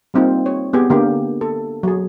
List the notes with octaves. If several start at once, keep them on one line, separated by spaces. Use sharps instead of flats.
G3 A#3 C4 D#4 F4
C#5
B3 G4 G#4
D3 A#3 G4
A4
F#3 G#4